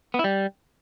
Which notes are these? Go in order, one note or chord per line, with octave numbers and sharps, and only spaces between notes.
B3
E4
G3